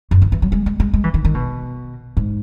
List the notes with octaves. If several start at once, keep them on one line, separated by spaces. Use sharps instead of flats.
F#2
D#3
E3
F#3
G#3
G#3
G#3
G#3
E3
D#3
D#3
B2
G#2